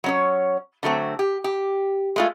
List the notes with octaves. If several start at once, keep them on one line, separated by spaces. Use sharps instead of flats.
F#3 C#4 C#5
D3 F#3 A3 C4
G4
G4
G#3 A3 F4